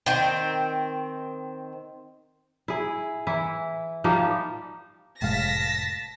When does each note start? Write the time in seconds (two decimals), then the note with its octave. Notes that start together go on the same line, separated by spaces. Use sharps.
0.06 D#3 C4
2.68 E4 G#4
3.27 E3 E4
4.04 F3 G3 A#3 D#4
5.22 F1 A2 G#3 F5 A5 A#6 B6